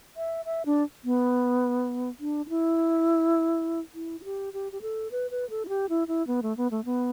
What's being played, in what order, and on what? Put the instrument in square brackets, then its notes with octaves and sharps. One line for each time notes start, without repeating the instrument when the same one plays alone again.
[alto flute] E5
E5
D4
B3
D4
D4
E4
E4
E4
G4
G4
G4
A4
B4
B4
A4
E4
G4
E4
E4
B3
A3
B3
A3
B3